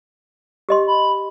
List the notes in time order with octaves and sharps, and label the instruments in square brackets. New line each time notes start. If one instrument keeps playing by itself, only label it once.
[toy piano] G4 D#5 C6
[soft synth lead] B5